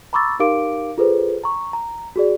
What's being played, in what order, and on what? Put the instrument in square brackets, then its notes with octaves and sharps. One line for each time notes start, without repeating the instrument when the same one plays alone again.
[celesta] A#5 B5 C#6 D6 E6 A6
D#4 G4 A#4 F5 D6 D7
F4 G#4 A4 B4 C5
A#5 C#6
A#5
F#4 G#4 D5